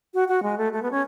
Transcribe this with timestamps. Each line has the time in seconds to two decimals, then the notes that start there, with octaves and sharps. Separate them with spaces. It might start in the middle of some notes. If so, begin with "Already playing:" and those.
0.14 F#4
0.28 F#4
0.43 G#3
0.58 A3
0.73 A3
0.82 B3
0.91 C#4